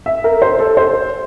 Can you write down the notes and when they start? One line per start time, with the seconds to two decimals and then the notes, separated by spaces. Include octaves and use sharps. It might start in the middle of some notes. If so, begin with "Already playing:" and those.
0.06 E5
0.24 A#4
0.42 C5
0.60 A4
0.77 C5